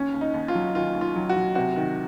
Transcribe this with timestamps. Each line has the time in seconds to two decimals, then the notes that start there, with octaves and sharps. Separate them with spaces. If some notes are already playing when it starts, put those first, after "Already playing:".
Already playing: D#2 C#4
0.14 D#2
0.21 D#4
0.34 D#2
0.48 F4
0.55 F#3
0.75 D#3 F4
0.94 D#2
1.01 F4
1.16 F#3
1.29 F#4
1.36 F#3
1.55 C3 F#4
1.76 D#3